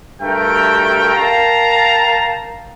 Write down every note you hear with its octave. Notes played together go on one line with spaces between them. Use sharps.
G2 A3 F#4 A#4 E5 G5
A#4 F5 G5 A5 A#5